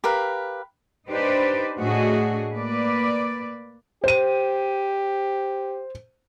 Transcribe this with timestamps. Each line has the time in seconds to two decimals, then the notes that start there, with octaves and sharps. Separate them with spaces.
0.04 G4 A#4 B4 F5
1.09 D4 D#4 G4 B4 C5 D5
1.79 A2 A3 D4 F#4 G#4 D#5
2.52 A#3 B4 D5
4.04 G4 C5 D#7